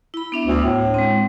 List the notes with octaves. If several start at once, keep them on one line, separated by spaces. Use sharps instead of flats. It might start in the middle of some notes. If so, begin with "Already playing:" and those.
E4 B5
B3 D4 E5
D2
A2
G#3 C4